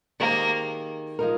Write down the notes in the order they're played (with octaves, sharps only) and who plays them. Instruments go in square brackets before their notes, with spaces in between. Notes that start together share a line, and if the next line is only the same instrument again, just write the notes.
[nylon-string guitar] D#3 G#3 C4 G4 [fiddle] A#3
[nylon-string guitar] F3 G#3 D#4 A#4